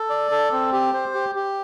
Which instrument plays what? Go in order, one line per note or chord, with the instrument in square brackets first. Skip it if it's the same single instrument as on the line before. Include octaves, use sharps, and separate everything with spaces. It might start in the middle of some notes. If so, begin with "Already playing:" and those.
Already playing: [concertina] A4
D5
A4
C4
G4
C5
G4
G4